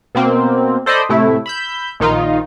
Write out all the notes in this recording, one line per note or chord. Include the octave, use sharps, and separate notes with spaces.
B2 A#3 C4
A4 C5 D5 D#5 B5
A2 C3 A3 E4
B5 E6 G6
A#1 D#3 D#4 F4